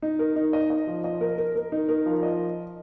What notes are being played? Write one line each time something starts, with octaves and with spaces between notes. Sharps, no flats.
D#4
A#4
D#4
D#5
D#5
F3
D#5
A#4
A#4
A#4
D#4
A#4
F3
D#5